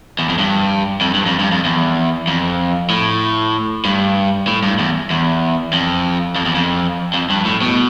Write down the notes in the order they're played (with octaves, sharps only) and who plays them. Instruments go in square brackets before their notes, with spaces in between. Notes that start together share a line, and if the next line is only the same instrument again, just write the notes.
[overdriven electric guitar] E2
F2
G2
F2
G2
F2
G2
F2
E2
F2
A2
G2
A2
G2
E2
E2
F2
F2
E2
F2
F2
G2
A2
B2